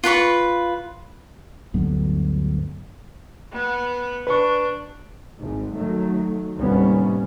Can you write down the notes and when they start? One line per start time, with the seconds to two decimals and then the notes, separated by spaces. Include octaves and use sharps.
0.04 F4 B4 B5 C#6
1.74 D2 G2 F#3 B3
3.52 B3
4.27 D4 B4 C#6
5.41 G#1 G#2
5.75 D#3 F#3 A3
6.57 D#2 A2 C3 G3 B3 C#4